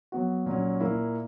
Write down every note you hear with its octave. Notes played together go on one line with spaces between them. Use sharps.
F#3 B3 F#4
A#2 F#3 C#4
A#2 A#3 E4